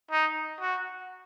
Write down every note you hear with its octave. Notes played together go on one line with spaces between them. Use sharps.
D#4
F#4